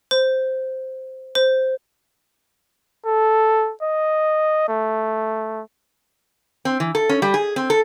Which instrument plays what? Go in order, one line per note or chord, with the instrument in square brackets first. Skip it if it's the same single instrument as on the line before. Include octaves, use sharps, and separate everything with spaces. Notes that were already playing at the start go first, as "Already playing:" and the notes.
[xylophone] C5
C5
[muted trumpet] A4
D#5
A3
[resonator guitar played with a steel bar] C4
E3
A4
C#4
G3
G#4
C4
A4